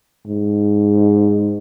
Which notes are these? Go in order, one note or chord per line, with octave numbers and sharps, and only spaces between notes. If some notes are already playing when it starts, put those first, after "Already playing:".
G#2